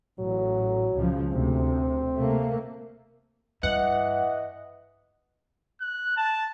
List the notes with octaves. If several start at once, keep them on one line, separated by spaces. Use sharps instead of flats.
A1 F#3
C#2 C#3 F3
D2 C3 C4
C3 A3 A#3
G2 E3 D#5 F#5
F#6
A5